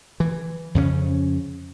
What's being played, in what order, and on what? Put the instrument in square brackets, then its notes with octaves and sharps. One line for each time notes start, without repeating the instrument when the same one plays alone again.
[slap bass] E3
F2 C#3 B3 C#4